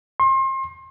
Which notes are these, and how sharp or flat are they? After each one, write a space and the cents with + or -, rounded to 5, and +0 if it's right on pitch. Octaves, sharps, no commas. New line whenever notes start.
C6 +35